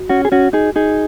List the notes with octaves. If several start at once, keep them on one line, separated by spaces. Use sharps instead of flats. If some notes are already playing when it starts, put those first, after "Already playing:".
Already playing: F#3
C#4 F#4
G#4
C#4 F#4
D#4 G#4
D#4 G#4